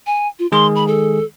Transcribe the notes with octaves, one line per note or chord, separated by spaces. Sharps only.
G#5
F4
D#3 G#3 G#4 C6
B5
A4